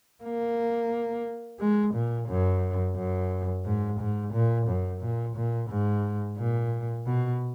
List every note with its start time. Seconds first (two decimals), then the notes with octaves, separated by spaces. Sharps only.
0.23 A#3
1.60 G#3
1.94 A#2
2.28 F#2
2.96 F#2
3.65 G#2
4.00 G#2
4.33 A#2
4.67 F#2
5.01 A#2
5.36 A#2
5.69 G#2
6.38 A#2
7.06 B2